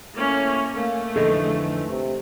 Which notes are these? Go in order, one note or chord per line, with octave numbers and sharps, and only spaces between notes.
A2 A#3 C#4
A3 A#3
F2 D3 E3 D#4 A4
C3